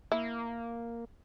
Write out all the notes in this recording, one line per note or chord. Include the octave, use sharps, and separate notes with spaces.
A#3 E4